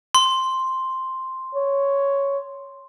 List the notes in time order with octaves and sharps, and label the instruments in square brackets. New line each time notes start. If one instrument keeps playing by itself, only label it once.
[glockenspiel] C6
[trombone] C#5